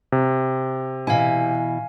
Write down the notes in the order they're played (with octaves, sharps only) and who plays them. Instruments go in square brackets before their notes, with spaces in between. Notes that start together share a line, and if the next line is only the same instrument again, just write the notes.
[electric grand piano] C3
[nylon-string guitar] B2 E3 E4 [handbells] F5 G#5